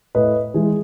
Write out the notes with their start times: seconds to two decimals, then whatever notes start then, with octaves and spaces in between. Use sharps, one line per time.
0.15 A2 B4 D#5
0.54 E3 G#3 G#4